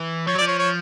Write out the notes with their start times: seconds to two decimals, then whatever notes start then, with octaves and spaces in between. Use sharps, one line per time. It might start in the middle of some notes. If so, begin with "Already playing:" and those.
Already playing: E3
0.27 F3 C#5
0.35 F#3
0.38 F3 D5
0.47 C#5
0.59 C#5